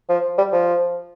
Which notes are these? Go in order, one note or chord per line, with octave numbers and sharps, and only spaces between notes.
F3
G3
F3